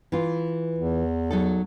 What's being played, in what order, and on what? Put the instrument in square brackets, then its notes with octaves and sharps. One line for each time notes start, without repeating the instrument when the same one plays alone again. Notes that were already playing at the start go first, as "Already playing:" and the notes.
[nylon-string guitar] E3 F4
[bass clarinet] E2
[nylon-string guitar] F#3 D#4 A4